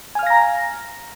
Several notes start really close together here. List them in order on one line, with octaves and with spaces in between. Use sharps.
G#5 F6 F5 A#6 A#5